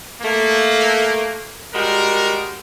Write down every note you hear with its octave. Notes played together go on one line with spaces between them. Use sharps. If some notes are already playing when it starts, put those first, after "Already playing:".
A3 A#3
G3 G#3 F#4 A#4